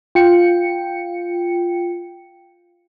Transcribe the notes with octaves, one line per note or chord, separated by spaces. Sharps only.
F4 G5 C#7